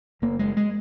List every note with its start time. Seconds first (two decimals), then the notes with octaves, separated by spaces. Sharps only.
0.22 F#1 A#3
0.39 G#3
0.57 G#3